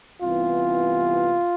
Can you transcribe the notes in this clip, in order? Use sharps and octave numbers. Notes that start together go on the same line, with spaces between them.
C2 C3 E3 B3 F4